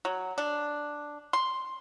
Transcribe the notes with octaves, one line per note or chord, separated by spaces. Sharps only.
F#3
D4
C6